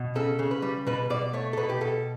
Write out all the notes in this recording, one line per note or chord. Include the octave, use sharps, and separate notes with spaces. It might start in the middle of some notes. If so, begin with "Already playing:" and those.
Already playing: B2
C#3 A4
C#3
B4
G3
B2 B4
B2 D5
A3 C#5
A4
B2 B4
G4
B2 A4